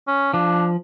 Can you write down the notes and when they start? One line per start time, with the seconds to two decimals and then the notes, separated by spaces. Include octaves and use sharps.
0.07 C#4
0.34 F3 D4